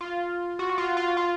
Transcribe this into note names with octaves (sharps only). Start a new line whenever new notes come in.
F4
F#4
F#4
F4
F4
F4